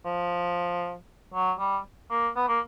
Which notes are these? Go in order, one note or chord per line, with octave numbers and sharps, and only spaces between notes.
F3
F#3
G3
A#3
B3
A#3